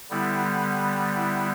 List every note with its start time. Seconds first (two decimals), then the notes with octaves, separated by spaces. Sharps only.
0.10 D3 G3 B3 E4
1.15 E4